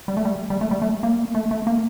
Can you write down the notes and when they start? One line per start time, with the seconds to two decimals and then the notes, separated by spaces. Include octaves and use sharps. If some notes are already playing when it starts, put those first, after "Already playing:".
0.08 G3
0.17 A3
0.25 G3
0.50 G3
0.61 A3
0.71 G3
0.82 A3
1.03 A#3
1.35 A3
1.51 A3
1.67 A#3